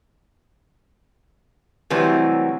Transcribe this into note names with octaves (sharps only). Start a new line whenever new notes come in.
A2 C3 E3 F#3 G3